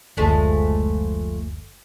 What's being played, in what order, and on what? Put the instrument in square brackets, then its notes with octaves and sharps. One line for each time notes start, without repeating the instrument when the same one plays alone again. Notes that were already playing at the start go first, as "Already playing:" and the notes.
[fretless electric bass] F#1 D2 [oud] F3 G#3 A3